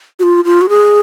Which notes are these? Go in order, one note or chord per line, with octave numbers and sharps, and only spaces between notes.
F#4
F4
F4
F#4
G#4